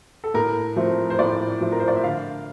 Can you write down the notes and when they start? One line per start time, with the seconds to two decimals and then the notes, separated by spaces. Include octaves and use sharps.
0.24 A4
0.34 A2 A#4
0.76 F3 A3 C4
1.10 C5
1.19 A2 D5
1.61 F3 A3 C4
1.72 A#4
1.80 C5
1.88 D5
1.96 E5
2.04 D3 F5